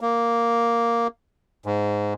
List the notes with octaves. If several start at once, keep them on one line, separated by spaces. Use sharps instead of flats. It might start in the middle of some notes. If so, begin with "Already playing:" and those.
A#3
G#2